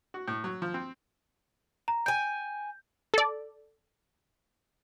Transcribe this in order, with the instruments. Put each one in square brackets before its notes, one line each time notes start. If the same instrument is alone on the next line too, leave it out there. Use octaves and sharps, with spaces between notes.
[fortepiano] F#4
A2
F#3
F3
C4
[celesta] A#5
[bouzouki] G5 G#5 [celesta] G6
[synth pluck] A4 D5